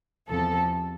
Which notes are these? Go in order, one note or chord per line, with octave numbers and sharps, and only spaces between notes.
E2 C3 F3 A4